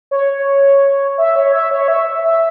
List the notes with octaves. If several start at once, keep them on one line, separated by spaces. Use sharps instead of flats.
C#5
E5
C#5
E5
C#5
E5
E5